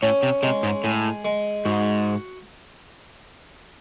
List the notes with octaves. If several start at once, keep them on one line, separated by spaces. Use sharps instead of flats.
A2 C#4
C3
C3 G#3
G#2
A2 G#4
G#3
G#2 F#4